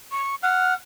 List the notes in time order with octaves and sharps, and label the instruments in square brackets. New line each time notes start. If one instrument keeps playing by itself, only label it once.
[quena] C#6
[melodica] F#5 [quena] F6